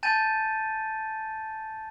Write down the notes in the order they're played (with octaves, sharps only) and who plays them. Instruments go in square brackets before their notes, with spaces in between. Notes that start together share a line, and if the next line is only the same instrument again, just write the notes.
[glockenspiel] G#5 A5 G6 A6 D#7